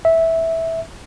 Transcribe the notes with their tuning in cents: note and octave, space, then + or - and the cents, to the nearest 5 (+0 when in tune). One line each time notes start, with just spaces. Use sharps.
E5 -10